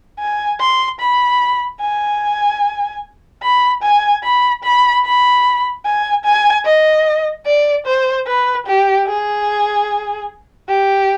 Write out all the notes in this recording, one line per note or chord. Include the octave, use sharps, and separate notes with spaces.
G#5
C6
B5
G#5
B5
G#5
B5
B5
B5
G#5
G#5
D#5
D5
C5
B4
G4
G#4
G4